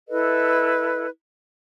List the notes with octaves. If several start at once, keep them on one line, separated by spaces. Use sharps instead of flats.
E4 A4 B4 D#5